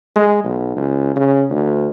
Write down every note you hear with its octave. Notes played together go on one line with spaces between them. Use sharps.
G#3
B1
C#2
C#3
D2